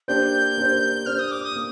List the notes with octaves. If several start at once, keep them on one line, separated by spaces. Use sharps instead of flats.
A#3 D4 G4 C5 G6
A#3 D4 G4 C5
A#3 D4 G4 C5 F6
D#6
D6
D#6
A#3